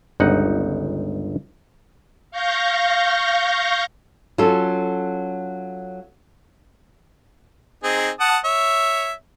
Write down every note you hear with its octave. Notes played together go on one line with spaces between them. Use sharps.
G1 C#2 D#4 F#5
F5 C#6 G6 A#6
F#3 C#4 F4 A4
C4 D#4 G#4
F#5 A5 D#6
C#5 E5